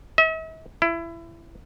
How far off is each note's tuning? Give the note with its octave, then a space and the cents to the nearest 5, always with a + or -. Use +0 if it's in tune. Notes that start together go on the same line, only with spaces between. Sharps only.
E5 -45
E4 +25